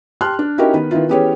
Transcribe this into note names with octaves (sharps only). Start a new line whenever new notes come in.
G4 A5 C6 F6 F#6
D4
C#4 D#4 E4 F#4 G4 A#4
D#3 B3 B4
D#3 B3 E4 F4
E3 B3 C#4 G4 G#4 C#5